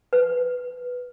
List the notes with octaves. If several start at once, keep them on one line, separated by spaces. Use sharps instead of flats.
B4